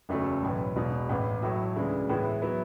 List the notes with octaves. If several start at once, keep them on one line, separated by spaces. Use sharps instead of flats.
F#1 E2 C#3 F#3 A3
B1 A2 E3
E1 E2 B2
A1 A2 E3
A2 F#3 A3 E4
D2 C#3 E3 G#3 D4
A2 E3 G#3 B3 E4
F#3 B3 E4